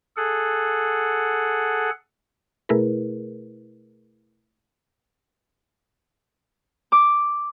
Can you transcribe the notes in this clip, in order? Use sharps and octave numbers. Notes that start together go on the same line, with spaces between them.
G#4 A4 F#5
B2 A3 E4 G#4 A#4 B4
D6